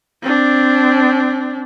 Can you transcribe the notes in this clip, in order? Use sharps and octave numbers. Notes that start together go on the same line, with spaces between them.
C4 D4